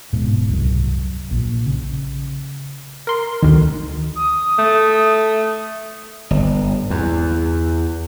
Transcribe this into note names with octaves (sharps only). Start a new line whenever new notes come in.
D1 G#2 B2
C2 F#2
A#1 A#2
C#3
A#4 C6
D2 D#3
D#6
A3
G1
E2